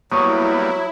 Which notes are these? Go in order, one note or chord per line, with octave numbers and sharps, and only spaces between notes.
F#3 G3 A#3 B3 E4 C#6 D#6